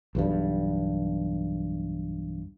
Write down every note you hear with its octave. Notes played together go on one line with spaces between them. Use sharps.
B1 E2 G2